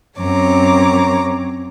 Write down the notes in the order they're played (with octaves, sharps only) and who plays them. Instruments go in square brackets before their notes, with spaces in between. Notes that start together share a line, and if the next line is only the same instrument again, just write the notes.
[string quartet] F#2 C4 C#5 A#5 D6